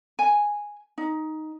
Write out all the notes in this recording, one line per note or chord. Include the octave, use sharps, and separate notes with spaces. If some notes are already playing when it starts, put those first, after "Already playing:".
G#5
D#4